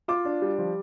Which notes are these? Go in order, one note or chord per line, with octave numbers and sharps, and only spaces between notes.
F4 D6
D4
G3
F3